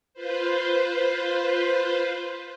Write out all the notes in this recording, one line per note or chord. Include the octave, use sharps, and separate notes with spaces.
F4 B4 C5